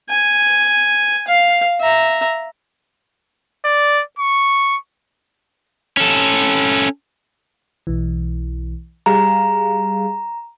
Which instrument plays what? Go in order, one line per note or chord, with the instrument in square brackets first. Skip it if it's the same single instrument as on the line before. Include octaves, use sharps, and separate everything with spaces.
[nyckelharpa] G#5
F5
E5 A#5
[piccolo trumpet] D5
C#6
[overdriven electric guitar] C#4 A4
[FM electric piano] B1 E3
[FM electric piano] G3 G#4 F5 [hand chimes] A#5